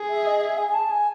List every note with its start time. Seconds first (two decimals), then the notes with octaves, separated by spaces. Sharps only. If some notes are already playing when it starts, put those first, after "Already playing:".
Already playing: G#4
0.09 E5
0.26 D#5
0.41 E5
0.58 G#5
0.68 G#5
0.74 A5
0.91 G#5